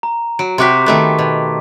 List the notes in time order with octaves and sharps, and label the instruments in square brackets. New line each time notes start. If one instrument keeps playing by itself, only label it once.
[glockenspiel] A#5
[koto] F#3 [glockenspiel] D7
[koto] C3 F#4 G4 [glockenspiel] C6 D6 B6
[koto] D#3 A3 B3
B2